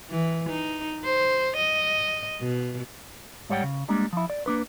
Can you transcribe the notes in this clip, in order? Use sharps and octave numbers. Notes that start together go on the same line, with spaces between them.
E3
D#4
C5
D#5
B2
G#2 G3 C#5 F#5 G5
C#3
G3 G#3 A#3 D4
F3 E4
D5
A#3 D4 B4